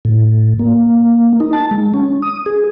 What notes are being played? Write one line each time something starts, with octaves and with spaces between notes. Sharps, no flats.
A2
A#3
D#4
A5
G#3
C#4
D#6
G#4